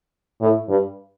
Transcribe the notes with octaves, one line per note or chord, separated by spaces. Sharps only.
A2
G2